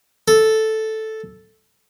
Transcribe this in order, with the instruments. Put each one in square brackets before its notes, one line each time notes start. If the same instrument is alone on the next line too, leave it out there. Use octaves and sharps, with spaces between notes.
[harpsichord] A4